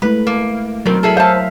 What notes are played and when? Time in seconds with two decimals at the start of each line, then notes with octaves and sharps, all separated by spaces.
0.02 G#3 A3 E4 B4
0.27 A#3
0.86 B2 D#3 F#3 C4 A#4
1.03 E4 G#4 A4
1.17 C5 E5 F5 A5